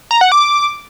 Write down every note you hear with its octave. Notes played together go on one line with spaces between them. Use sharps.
A#5
F#5
D6